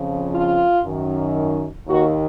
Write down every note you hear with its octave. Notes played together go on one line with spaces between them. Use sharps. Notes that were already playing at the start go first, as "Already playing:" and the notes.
Already playing: F2 C#3 F3
F4
F#2 D#3
D#2 D#3 F#4